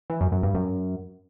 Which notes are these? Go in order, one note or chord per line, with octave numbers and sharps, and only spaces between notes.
E3
F#2
F#2
G2
F#2